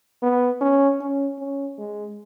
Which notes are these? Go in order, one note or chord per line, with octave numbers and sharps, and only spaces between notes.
B3
C#4
C#4
C#4
G#3